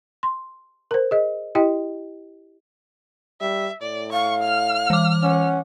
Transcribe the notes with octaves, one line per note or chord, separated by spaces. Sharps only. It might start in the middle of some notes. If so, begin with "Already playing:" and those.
C6
A#4 C5
G#4 D#5
E4 G4 D#5 G5
G3 E5
A2 D5
F5 C#6
F6
E3 D6
C#4 F#5